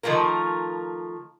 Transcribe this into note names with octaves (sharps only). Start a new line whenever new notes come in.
D#3 F3 A3 F4 A#4